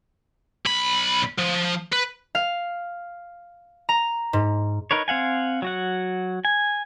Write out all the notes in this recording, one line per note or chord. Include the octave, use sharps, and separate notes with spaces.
B1 B5
F3
B4
F5
A#5
G#2
D#4 A#4 B4 C#5
C4 F5 F#5 G#5
F#3 F#4 F#5
G#5